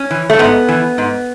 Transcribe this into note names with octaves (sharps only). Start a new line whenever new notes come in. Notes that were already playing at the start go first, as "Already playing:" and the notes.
Already playing: C#4
E3
A3
G#2 B3
E3
G#2